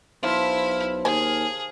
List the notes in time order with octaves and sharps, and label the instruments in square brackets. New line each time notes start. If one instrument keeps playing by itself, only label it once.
[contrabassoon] B1 [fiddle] E4 B5 [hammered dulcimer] C5 F5 A5
[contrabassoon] D#2 [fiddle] G#4 [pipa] G#5